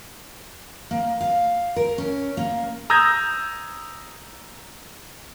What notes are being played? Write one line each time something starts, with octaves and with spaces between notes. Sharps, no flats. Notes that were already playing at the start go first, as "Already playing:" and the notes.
A#3
F5
A#4
C#4
A#3
A#5 D#6 E6 G6 G#6 A#6